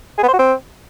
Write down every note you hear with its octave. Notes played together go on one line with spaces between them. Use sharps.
G#4
B3
C5
F#4
C4